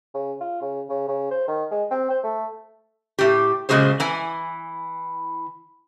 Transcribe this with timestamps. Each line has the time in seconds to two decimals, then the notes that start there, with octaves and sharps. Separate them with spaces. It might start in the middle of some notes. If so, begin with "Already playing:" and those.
0.14 C#3
0.41 F4
0.61 C#3
0.89 C#3
1.08 C#3
1.31 C5
1.48 D#3
1.71 G#3
1.91 C4
2.10 C5
2.24 A3
3.19 A2 G4
3.69 A#2 C#3 G#3 F#4 G#4 C5
4.00 E3 E4 G#5